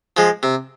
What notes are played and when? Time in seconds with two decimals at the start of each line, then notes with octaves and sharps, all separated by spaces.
0.17 F3 G#3
0.43 C3